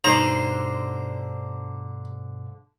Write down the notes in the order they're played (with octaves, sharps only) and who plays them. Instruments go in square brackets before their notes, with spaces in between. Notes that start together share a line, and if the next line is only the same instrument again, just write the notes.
[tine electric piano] G2 B2 F5 [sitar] D3 C5 [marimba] D#4 [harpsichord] A#5